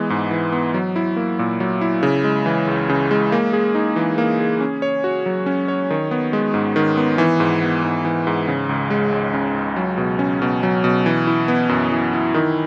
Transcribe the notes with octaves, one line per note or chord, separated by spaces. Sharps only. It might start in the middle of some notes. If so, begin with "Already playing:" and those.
Already playing: E3 G#3 B3
G#2
E3
B3
F#3
E4
A#3
A#2
F#3
E4
C#3
G#3
E3
C#2
C#3
G#3
A#3
G#4
D#4
E3
A#3
G#4
C#4
C#5
F#4
F#3
C#4
C#5
D#3
B3
G#3
G#2
D#3
B3
E3
G#2
B3
G#2
E3
G#2
C#3
C#2
G#3
C#2
C#3
C#2
F#3
B2
C#4
B2
F#3
B2
E3
E4
B3
F#2
E3
E4
D#3